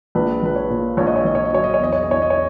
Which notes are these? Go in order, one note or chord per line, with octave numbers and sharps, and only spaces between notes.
A#1 B4
A#1 B4
C#5
A#2
A#1 C#5
D#5
C#5
A#1 D#5
C#5
D#5
F#3 C#5
D#5
C#5
E2 D#5
C#5
D#5
E2 C#5
D#5
C#5